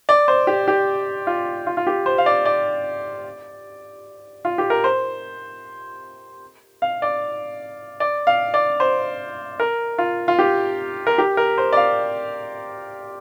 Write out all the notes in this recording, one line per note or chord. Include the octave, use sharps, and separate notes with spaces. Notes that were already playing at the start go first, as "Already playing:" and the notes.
D5
C5
G4
G4
F4
F4
F4
G4
C5
F5
D5
D5
F4
G4
A#4
C5
F5
D5
D5
F5
D5
C5
A#4
F4
F4
G4
A#4
G4
A#4
C5
D5
F5